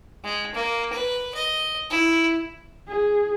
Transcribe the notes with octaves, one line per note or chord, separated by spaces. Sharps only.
G#3
A#3
B4
D#5
E4
G#4